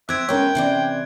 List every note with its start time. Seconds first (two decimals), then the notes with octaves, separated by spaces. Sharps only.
0.09 C4 C5 E5 D6 F#6 G#6 D7
0.29 G#3 B3 C#4 A#4 C#5 G5
0.55 C3 E3 C4 C#4 D5